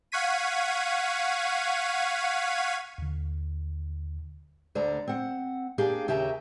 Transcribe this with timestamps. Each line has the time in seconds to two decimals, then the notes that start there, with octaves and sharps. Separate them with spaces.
0.12 F5 F#5 C#6 G#6 B6 D#7
2.98 D#2 D3
4.75 D2 D3 D5 A#5
5.08 C4 F#5
5.78 A#3 D4 G4 G#4 F5
6.08 D#2 C#3 G4 G#4 E5 A#5